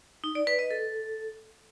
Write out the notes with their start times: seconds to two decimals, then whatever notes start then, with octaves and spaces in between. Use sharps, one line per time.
0.24 D#4
0.35 D5
0.47 B4
0.59 D#5
0.71 A4